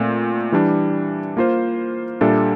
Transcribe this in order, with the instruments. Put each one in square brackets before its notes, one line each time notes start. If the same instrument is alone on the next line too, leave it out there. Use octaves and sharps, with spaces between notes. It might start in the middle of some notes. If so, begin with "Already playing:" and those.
Already playing: [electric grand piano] A#2 A3 C4
E3 G3 D4
A#3 F4 C5
A#2 G3 D4 A4 E5